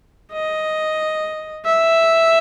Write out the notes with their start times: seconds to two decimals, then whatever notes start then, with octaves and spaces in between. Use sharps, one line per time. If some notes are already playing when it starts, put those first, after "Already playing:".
0.32 D#5
1.66 E5